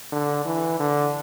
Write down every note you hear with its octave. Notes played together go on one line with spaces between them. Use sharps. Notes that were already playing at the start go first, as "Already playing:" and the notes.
D3
E3
D3